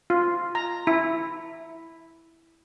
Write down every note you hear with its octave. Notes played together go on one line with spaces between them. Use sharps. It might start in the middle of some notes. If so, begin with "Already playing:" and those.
F4
A#5
E4